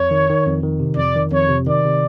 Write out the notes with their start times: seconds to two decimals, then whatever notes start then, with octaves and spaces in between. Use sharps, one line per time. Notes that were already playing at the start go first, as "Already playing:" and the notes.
Already playing: F2 C#5
0.11 D#3
0.29 D#3
0.46 F2
0.63 D#3
0.80 C3
0.97 F2 D5
1.15 D#3
1.32 F2 C#5
1.49 C3
1.67 D#3 D5
1.84 C3